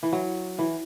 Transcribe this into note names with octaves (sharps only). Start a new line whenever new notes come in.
E3
F#3
E3